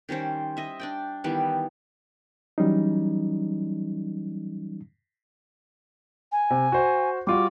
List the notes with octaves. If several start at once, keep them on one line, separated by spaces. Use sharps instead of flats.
D#3 G3 C#4 C5
D#5 E5
D4 D5 G5
D#3 E3 G3 B3
E3 F#3 G3 C#4 D#4
G#5
C3
F#4 C5
G3 F4 F#4 D6